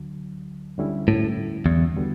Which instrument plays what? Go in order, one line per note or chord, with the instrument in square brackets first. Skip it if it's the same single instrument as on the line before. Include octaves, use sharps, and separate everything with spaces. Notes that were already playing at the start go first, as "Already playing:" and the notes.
Already playing: [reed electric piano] D2 D3 F#3
D2 D3 G3 C#4 E4
[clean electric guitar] A2
E2
[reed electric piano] D3 G3 B3 F#4